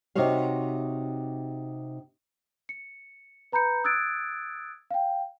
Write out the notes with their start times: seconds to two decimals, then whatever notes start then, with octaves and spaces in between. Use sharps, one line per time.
0.15 C3 D#4 F#4 C5 C#5 F5
2.69 C#7
3.52 B4 A#5 B5 G6 C#7
3.84 D#6 E6 F#6 G#6 A6 D7
4.91 F5 G5